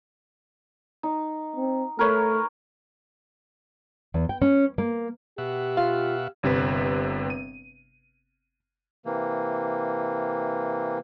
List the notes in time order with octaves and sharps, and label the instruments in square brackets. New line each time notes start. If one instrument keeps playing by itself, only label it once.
[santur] D#4
[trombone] C4
[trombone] A3 [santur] A#4 B4 C#5
[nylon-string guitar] E2
G5
C#4
A#3
[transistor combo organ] B2 E5 F#5 [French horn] G4
[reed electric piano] F4 [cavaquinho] F5
[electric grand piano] G1 C3 C4 B4
D#7
[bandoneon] C3 E3 A#3